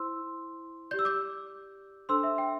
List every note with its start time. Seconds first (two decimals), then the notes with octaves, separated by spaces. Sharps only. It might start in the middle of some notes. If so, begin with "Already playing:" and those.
Already playing: E4 C5 C6 E6
0.91 G4 D5 G6
0.99 E6
1.05 D6 G6
2.09 D4 A4 C5 C6 E6
2.23 E5
2.38 G5